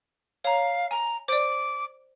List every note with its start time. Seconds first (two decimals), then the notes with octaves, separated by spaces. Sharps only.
0.44 C#5 F5 A#5
0.91 G#5 A#5
1.28 C5 D5 D6